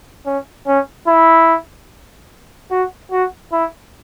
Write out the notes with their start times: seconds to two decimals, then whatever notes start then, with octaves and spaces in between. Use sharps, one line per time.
0.26 C#4
0.67 C#4
1.08 E4
2.71 F#4
3.12 F#4
3.52 E4